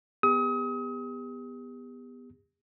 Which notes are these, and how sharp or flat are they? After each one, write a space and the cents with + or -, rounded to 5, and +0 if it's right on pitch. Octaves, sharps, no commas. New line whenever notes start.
B3 +0 G4 +40 D#6 +35